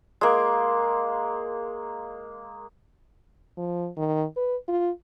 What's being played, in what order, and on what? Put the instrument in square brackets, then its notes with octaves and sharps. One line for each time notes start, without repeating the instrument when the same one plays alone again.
[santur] G#3 A#3
[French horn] F3
D#3
B4
F4